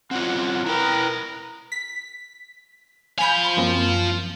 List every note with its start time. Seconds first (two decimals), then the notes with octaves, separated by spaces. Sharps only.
0.11 C4 C#4 F4 F#5
0.66 E4 A#4 B4 G5
1.72 B6
3.19 F3 F5 G#5 B5 G6
3.57 F#2 A#3 C4